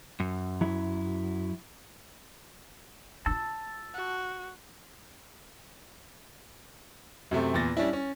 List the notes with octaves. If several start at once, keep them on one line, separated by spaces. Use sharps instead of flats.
F#2
F#3 E4
D#4 F4 A5 E6
F#4
F#2 C3 A3 C4
E2 A#2 A6 A#6
G3 C#4 D4 E4
C#4